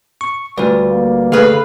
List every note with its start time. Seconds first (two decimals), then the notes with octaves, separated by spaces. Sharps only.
0.21 C#6
0.58 D2 G3 F4 B4 D5
0.90 A#3
1.32 D2 G#4 A4 B4 F5 B5